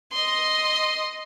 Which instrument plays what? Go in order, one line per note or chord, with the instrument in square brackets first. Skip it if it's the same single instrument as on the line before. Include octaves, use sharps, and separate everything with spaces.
[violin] D#5 C6